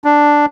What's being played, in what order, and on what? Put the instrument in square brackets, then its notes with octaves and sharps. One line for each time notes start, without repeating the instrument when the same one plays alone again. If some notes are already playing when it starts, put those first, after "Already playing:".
[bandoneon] D4